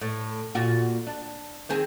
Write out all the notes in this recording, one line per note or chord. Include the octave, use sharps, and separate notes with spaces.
A2
A#2 F4 F#4
D4
D#3 C4 G#4